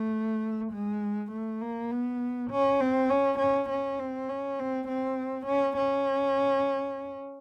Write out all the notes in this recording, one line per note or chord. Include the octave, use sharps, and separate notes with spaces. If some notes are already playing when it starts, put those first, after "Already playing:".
Already playing: A3
G#3
A3
A#3
B3
C#4
C4
C#4
C#4
C#4
C4
C#4
C4
C4
C#4
C#4